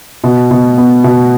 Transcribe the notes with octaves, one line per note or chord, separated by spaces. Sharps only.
B2
B2
B3
B2